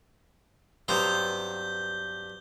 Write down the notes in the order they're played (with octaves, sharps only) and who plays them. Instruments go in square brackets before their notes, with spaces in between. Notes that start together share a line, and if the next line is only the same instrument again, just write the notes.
[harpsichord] G2 F5 A#5 [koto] F#3 B3 C4 [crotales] G6 G7